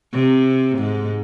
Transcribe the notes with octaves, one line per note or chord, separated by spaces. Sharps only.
C3
G#2 G#3